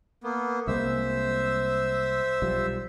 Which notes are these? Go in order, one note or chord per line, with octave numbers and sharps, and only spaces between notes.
A#3 B3
C2 G#3 A#3 C5 E5 E6
B1 F3 G3